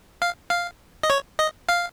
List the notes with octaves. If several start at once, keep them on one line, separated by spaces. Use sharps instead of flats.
F5
F5
D#5
C#5
D#5
F5